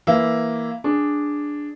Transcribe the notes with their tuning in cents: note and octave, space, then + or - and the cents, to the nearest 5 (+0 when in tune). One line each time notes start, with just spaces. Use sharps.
E3 +0 A#3 +0 E5 +0
D4 +0 G#4 +0